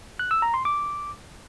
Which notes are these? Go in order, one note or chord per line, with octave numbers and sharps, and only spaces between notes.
F#6
E6
A#5
C6
D6